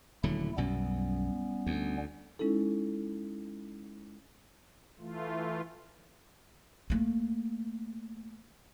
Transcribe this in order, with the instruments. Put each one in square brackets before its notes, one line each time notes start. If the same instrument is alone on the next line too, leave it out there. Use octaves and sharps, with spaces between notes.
[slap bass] D#1 D3 F#3 [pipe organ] A3 E4
[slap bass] B1 F#2 B2 [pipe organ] G3 B3 C#4
[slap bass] D2
[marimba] G#3 C#4 D#4 E4 A4
[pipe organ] E3 A3 F4
[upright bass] A3 A#3